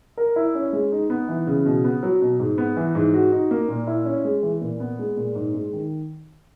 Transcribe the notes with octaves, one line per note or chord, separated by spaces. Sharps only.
A#4
E4
C#4
G#3
D#4
B3
E3
C#3
B2
B3
F#3
B2
G#2
B3
E3
G#2
F#4
D#4
A#3
A#2
E4
C#4
G#3
E3
A#2
B3
G#3
A#2
G#2
G#3
D#3